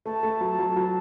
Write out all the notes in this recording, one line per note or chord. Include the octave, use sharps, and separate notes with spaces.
A3 A5
A3
F#3
F#3
F#3